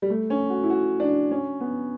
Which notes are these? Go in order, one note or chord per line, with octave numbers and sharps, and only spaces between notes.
G3
A3
C#4
F#4
E4
F#4
D4
C#4
B3